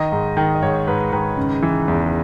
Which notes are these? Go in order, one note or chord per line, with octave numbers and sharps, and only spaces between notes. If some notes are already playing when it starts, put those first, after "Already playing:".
Already playing: D#3 D#5
G#2
D#3
D#5
G#2 C#5
G#2 B4
D#3 B4
C#3
E3
E2